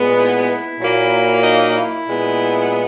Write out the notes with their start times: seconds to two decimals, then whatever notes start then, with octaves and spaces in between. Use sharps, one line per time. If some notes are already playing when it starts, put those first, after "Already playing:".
Already playing: A#2 G#3 B3
0.16 E4
0.79 A#2 F#3 A#3
1.43 D#4
1.75 E4
2.07 A#2 G#3 B3